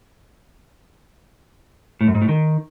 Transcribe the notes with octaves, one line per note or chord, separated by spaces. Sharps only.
A2
F#2
G#2
A2
D#3